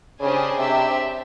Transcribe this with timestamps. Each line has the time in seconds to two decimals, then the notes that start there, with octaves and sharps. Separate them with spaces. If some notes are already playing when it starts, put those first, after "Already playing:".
0.20 C#3 D4 G4 C5 D#5 G#5
0.57 C3 D4 G4 C5 E5 G5